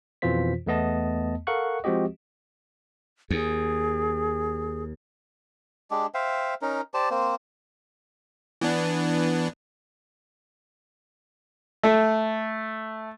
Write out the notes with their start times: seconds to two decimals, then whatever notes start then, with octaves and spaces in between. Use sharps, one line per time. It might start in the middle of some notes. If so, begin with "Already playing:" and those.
0.22 F2 B2 E3 F4 C5 B6
0.67 E2 A3 B3 D#5 A5
1.47 A4 A#4 F5 F#5 C#6 F#6
1.84 F3 G#3 C4 F#4 G4 D#5
3.30 D#2 G#4
5.91 G#3 D4 G4
6.14 C5 E5 F5 G5
6.62 C#4 D#4 A#4
6.94 G4 C5 D5 A5
7.10 A#3 C4 C5
8.61 E3 B3 D4
11.83 A3